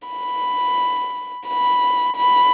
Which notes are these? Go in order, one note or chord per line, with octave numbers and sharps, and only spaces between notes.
B5
B5
B5